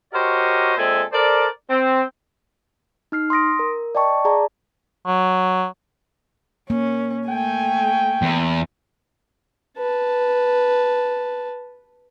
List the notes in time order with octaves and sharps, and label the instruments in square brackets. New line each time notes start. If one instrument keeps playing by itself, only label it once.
[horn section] F#4 G4 A#4 C5 C#5 D#5
A#2 G#3 C4 A4 E5 G#5
A4 A#4 C5 D5
C4
[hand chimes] D#4 F6 C7
C6 D#6 A#6 D7
A#4
D5 D#5 G5 A5 C#6
G#4 D5 A5 A#5
[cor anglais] F#3
[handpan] A#3 [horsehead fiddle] C#4
[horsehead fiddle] A3 G#5 [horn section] G5
[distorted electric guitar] E2
[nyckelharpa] B4 A5